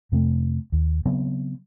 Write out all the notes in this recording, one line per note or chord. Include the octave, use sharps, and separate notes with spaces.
F2 C3 A3
D#2
C#3 F#3 B3 C4